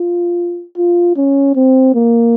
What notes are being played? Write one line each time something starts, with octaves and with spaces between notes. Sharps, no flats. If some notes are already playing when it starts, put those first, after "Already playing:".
Already playing: F4
F4
C#4
C4
A#3